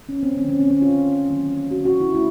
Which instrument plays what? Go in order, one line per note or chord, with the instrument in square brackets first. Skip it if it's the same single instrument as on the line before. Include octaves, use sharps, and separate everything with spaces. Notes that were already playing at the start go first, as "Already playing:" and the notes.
[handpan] C#4
C4
D3 F3 A3 C4
C#4
C4
C#4
F4
D#3 F#3 A#3
F#4
F#4
E4
A3 E4